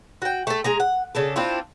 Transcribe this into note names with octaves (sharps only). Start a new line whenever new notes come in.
F#4 G5
A3 A4
G#3 G#4 A#5
F#5
C#3 D4 A4
C4 D4 E4 F4